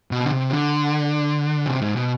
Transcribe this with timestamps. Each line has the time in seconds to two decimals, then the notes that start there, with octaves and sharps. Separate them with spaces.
0.11 B2
0.24 D3
0.32 C3
0.51 D3
1.66 C3
1.82 G#2
1.96 B2